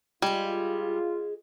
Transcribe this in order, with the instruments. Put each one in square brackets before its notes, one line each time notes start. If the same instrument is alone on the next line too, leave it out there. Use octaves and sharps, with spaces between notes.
[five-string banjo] G3 [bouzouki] G#3 G#4 [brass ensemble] F4